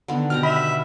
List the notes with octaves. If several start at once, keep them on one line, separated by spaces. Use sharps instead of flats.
D3 D#3 B3
B2 G4 A#5 F6
E5 B5